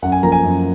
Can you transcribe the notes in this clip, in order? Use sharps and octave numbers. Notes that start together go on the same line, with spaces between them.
F#2 F#5
G#5
F3 A#3 A#5
G#5
F#2